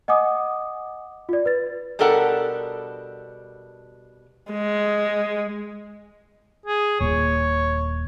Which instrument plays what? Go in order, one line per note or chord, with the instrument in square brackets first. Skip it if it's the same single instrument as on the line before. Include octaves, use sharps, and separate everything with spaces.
[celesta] D#5 F#5 G#5 D6 D#6
F4 D5
B4 A6
[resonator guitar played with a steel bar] B2 G3 D4 A4 A#4 F#5
[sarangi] G#3
[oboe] G#4
[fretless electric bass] D#1 A#2 [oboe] C#5